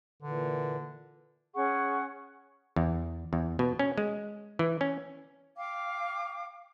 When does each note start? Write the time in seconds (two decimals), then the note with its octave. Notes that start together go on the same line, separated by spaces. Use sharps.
0.23 A#2 D3 E3
1.55 C#4 G#4 F#5 C#6
2.76 E2
3.33 E2
3.59 B2
3.79 C#4
3.98 G#3
4.59 E3
4.81 C#4
5.56 F5 G5 D6